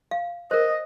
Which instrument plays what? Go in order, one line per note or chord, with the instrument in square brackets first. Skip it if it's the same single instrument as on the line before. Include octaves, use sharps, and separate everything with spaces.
[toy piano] F5
[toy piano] A#4 C5 [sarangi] D#5